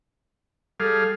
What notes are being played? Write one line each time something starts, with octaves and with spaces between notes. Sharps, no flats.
G3 G#4 A4 F5